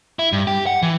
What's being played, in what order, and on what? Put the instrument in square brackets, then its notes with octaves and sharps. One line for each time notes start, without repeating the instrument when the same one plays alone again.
[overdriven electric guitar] E4
G2
G4
F#5
E3